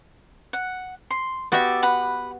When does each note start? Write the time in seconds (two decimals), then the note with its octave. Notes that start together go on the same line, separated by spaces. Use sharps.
0.53 F#5
1.11 C6
1.52 B3 F#4 G4 D5 E5
1.83 B4 F#5 B5